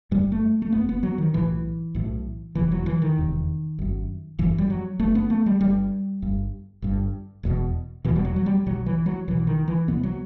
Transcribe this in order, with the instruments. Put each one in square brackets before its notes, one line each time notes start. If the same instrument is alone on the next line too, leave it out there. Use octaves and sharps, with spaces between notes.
[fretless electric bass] F#1 F#2 G3
A3
A3
F#1 F#2 B3
B3
F#3
D#3
B1 A2 E3
B1 A2
E1 E2 C3 E3
F#3
E3
D#3
E1 E2 C3
G1 F#2
G1 F#2 E3
G3
F#3
G1 G2 A3
B3
A3
G3
G1 G2 G3
G1 G2
G1 G2
E1 E2 B2
E1 E2 B2 E3
G3
F#3
F#3
G3
B1 B2 F#3
E3
F#3
B1 B2 E3
D#3
E3
C2 C3 B3
F#3